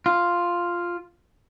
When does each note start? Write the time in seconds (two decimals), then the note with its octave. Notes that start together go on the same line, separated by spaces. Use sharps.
0.06 F4